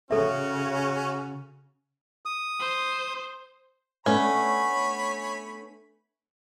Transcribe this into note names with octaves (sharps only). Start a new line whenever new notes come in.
C#3 C#4 F#4 A4 E5
D#6
C5
A3 B3 C#4 D4 C#5 G#5 B5